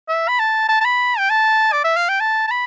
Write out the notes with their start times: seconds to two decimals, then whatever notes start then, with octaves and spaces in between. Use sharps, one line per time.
0.09 E5
0.28 B5
0.39 A5
0.69 A5
0.81 A5
0.85 B5
1.18 G5
1.30 A5
1.73 D5
1.84 E5
1.97 F5
2.09 G5
2.21 A5
2.48 A5
2.51 B5